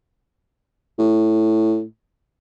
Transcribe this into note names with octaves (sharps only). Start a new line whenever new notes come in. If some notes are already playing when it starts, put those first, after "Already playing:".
A2